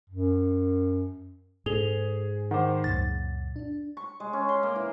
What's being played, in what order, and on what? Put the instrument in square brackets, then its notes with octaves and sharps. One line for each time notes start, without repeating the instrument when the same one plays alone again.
[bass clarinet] F#2
[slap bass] G#2 [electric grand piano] G#4 [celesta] A4 F7 G7
[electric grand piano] D#3 C5 [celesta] F#5 D6
[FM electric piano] C#2 F#2 A#2 [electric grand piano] A6
[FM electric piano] D4
[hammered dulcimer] C#6
G#3
C#4
C6
A#3
E3